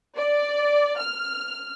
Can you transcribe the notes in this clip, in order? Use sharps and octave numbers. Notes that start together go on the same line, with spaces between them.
D5
F6